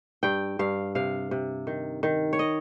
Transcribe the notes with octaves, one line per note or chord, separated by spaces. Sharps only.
G2 G5
G2 F5
C3 F5
C3
D#3
D#3
C#5
D#5